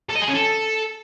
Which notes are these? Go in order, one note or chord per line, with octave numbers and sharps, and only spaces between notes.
A4
D#5
G#4
C#4
A4